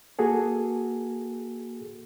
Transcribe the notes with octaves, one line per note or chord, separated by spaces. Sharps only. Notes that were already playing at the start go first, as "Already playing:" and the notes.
A#3 F#4 G#4 A4